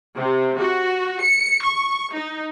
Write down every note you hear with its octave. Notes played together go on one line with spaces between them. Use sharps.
C3
F#4
C#7
C#6
D#4